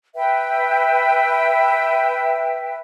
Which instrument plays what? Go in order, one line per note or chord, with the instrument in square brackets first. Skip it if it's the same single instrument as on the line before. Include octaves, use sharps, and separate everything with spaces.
[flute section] B4 E5 G5